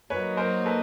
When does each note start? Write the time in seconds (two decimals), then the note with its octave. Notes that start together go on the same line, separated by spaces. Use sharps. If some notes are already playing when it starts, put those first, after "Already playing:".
0.10 F#3 A#3 D#4 B4 C#5
0.37 A#4 C5
0.66 A4 B4